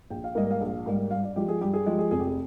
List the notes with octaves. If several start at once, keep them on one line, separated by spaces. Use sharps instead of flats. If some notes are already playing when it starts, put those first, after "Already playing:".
A#1 G5
F5
G#2 G3 A#3 D#5
F5
A#1
G#2 G3 A#3
G2 F5
D5
F3 G#3 G4
G#4
G2 G4
G#4
F3 G#3 G4
G#4
F1 G#4
G4
G#4